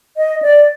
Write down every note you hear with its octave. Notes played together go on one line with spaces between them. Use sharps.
D#5
D5